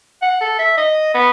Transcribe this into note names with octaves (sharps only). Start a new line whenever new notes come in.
F#5
A4
E5
D#5
B3